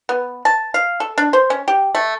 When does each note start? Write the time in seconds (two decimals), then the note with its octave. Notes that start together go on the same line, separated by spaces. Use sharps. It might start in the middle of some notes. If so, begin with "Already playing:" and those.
0.09 B3
0.45 A5
0.74 F5
1.00 A4
1.18 D4
1.33 C5
1.50 C#4
1.68 G4
1.95 A3